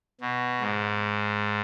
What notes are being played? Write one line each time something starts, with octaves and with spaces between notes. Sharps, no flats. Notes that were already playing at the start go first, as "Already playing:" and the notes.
B2
G#2